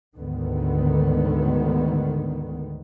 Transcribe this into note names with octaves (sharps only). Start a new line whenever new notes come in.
D2 G#2 D3 D#3 B3